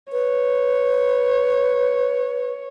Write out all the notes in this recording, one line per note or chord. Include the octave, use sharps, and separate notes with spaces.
B4 C#5